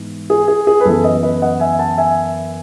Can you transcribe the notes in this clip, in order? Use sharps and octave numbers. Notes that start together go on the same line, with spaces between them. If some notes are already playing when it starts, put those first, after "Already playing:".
Already playing: G#2 E3 B3
G#4
G#4
G#4
B4
F#2 E3 B3 A4
B4 D#5
B4 D#5
D#5 F#5
E5 G#5
F#5 A5
E5 G#5